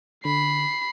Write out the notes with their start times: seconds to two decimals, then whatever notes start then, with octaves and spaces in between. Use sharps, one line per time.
0.25 D3 B5 C7